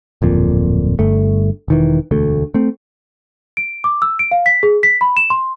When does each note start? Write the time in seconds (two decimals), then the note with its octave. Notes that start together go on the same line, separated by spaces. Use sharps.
0.22 D1 F2 A#2
0.99 G1 G2 A3
1.68 E1 D#3 E3
2.11 E1 D2 A3
2.54 A3 C4
3.57 D7
3.84 D6
4.02 E6
4.19 D7
4.31 F5
4.46 B6
4.63 G#4
4.83 B6
5.01 B5
5.17 E7
5.30 C6